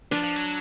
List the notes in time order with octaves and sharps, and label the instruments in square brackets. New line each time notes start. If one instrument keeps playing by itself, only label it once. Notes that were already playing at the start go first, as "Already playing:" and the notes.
[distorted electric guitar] F3 [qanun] D4
[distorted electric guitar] F3
F#3